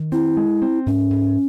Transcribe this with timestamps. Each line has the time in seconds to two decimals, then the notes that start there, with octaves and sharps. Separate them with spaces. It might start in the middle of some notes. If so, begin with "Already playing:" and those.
Already playing: D#3
0.12 C4 E4
0.37 G#3
0.62 C4
0.86 G#2 C#4
1.10 G#2